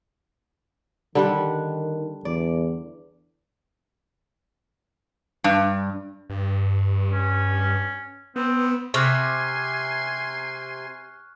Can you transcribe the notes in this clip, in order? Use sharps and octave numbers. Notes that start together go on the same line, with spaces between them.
D3 D#3 G3 F#5
E2 D5
G2
G2
C#4
B3 C4
C3 G#5 C6 C#6 F6 F#6